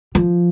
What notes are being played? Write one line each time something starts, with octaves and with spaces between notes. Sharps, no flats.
F3